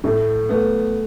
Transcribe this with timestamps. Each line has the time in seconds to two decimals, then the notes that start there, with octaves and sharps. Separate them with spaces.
0.04 A2 A3
0.49 A3 B3